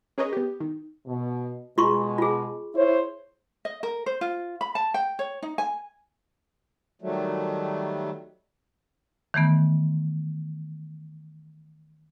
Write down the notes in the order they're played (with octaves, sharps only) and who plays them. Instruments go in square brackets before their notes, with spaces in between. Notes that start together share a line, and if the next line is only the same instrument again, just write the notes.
[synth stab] C#4 G#4 A#4 B4 C#5 D#5
B3 G4
D#3
[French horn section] B2
[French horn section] B2 G#3 [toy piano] F4 C6 C#6
[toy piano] F4 G#4
[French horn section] E4 C5 C#5
[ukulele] D#5
A#4
C5
F4
B5
A5
G5
C#5
D#4
G#5
[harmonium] D#3 F#3 G3 A3
[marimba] D#3 E3 A3 B3